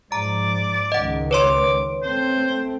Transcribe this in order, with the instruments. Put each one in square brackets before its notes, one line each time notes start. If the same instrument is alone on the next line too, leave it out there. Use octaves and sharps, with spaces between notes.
[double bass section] G#2 F3 [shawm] D5 [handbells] A#5
[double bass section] C#2 D#3 [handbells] D#5 F#5
[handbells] B4 C#5 C6 [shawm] D6
[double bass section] A3 C4 [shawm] C5